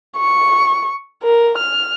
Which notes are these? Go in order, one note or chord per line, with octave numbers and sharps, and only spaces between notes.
C#6
A#4
F6